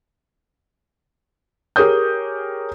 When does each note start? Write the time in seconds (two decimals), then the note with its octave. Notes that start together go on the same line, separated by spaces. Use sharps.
1.76 G4 G#4 A#4 C#5 D#6 G6